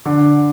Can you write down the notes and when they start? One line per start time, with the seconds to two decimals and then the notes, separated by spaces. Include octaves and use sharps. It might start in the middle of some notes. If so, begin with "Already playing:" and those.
0.05 D3